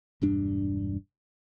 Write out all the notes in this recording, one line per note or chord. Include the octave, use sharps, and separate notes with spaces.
E1 G2 D4